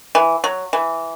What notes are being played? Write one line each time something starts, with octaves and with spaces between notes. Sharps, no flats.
E3
F#3
E3